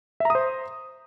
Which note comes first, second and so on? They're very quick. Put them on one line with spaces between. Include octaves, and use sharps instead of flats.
E5 A#5 D#6 C5